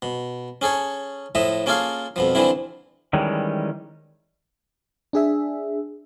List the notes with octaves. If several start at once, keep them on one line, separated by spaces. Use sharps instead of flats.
B2
C#4 G#4 A4 C#5
A2 F3 D#5 E5
A#3 C#4 F4 G#4 A4 F5
F2 B2 F3
D3 E3 F3 C4 E4
D#3 E3 G3 G#3 C#4
D4 G#4 E5